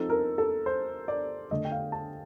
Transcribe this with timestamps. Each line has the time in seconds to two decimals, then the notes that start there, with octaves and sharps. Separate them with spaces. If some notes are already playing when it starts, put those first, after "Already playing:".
Already playing: F3 C4 D#4 A4
0.10 A#4
0.38 A4
0.66 C5
1.08 D5
1.51 D3 A3 D4 D#5
1.65 G5
1.72 F5
1.92 A5